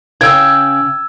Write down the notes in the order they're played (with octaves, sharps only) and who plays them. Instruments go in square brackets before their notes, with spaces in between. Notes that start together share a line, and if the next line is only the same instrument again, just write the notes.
[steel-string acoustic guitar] C#3 G5 [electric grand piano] E6 G#6